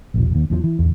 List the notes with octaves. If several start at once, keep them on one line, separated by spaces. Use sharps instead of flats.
E1 A#1
D#2
E2 G2 F3
E3
D1 E2